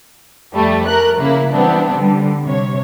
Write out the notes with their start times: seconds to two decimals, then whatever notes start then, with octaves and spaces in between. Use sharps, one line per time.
0.54 F2 G3 A3
0.87 A#4 F#6
1.18 C#3 A#3 E4
1.52 E3 G3 B3 C4 D4
1.96 D3 G3
2.44 C3 C#5